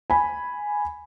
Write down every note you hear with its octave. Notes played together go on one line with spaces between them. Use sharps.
G#5 B5